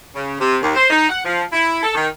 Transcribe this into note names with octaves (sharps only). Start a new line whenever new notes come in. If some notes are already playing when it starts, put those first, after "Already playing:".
C#3
C3
D#2
C5
D#4
F#5
F3
E4
A4
D#3